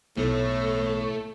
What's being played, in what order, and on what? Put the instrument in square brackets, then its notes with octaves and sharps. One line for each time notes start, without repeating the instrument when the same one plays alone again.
[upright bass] B1 E3 [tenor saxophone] A2 [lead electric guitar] A3